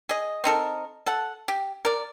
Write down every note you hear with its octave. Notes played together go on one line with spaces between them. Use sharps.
G#4 D#5
C4 D#4 A4 A#4
A4 F#5
G4
A#4 D5